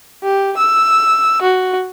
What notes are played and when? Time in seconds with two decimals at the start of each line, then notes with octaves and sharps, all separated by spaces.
0.22 G4
0.57 E6
1.42 F#4